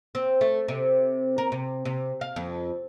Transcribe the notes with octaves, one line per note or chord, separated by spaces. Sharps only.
C4
A3
C3
A#4
C3
C3
F5
F2